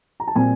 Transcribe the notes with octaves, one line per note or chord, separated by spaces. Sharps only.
A#5
A5
A#2 G3 C4 G#5